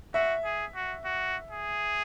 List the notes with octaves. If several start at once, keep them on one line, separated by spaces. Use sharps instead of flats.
F#4 E5
G#4
F#4
F#4
G#4